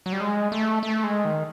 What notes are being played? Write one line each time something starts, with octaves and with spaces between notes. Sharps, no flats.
F#3
G3
G#3
A3
A3
G#3
D#3